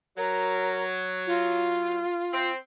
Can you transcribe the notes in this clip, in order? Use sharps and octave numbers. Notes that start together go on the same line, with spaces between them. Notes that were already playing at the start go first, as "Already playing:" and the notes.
F#3 A#4
F4
C4